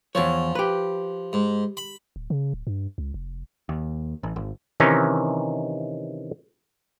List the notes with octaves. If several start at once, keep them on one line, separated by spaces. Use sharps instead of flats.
E2 F3 C#5
G4 B4
G#2
B5
D1
C#3
D1
G2
C#2
F1
D#2
A1
G#1
C3 D#3 E3 C#4 D#4